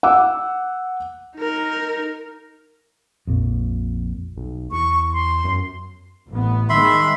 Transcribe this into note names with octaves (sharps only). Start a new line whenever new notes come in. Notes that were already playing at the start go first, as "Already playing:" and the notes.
F#5 D6 E6
D#4 A#4
A#1 F2
B1
E2 C#6
C6
F#2
A1 B3
D#3 G#3 E5 B5 C6